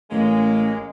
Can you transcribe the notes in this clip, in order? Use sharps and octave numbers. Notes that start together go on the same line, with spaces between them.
A1 G#3 A#3 C#4